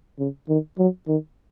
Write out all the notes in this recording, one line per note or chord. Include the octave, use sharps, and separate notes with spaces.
C#3
D#3
F#3
D#3